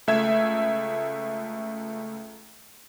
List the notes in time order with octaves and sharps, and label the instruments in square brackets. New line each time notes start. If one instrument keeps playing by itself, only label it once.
[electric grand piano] C#2 A3 E5 E6 G#6